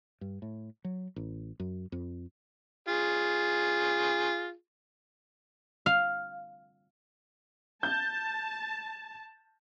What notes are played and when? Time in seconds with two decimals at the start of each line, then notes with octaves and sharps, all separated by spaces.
0.21 G2
0.42 A2
0.84 F#3
1.16 A1
1.60 F#2
1.92 F2
2.88 F4 G#4
5.86 F5
7.83 A5 G6